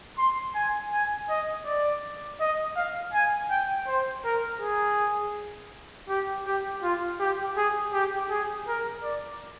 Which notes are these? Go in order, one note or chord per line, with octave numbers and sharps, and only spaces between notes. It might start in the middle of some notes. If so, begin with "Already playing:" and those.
C6
G#5
G#5
D#5
D5
D#5
F5
G#5
G5
C5
A#4
G#4
G4
G4
F4
G4
G#4
G4
G#4
A#4
D5